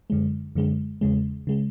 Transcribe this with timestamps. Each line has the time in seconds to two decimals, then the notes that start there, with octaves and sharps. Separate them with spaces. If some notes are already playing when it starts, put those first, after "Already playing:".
0.10 F#2 D3 G#3
0.55 F#2 D3 G#3
1.01 E2 C#3 G#3
1.47 C#3 G#3